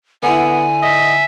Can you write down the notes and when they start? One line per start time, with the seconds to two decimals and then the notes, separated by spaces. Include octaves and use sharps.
0.23 D3 B3 E4 G#5
0.82 D#5 E5